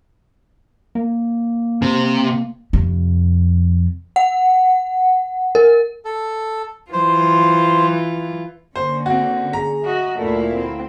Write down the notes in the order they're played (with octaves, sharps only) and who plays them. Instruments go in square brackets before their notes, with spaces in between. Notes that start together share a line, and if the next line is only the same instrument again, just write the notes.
[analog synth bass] A#3
[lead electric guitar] C3
[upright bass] F2 C3
[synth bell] F#5
A#4
[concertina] A4
[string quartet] E3 F4 [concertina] C5
[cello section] D3 A#3 C#4 [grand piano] C5
[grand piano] C4 F#4
[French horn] G#4 [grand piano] A#5
[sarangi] F#4 [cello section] D#5 E5
[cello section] D2 E4 F5 [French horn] A#2 [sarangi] A3
[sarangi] C4